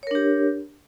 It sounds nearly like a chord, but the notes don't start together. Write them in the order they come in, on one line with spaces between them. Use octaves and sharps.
C#5 A#4 D4 G4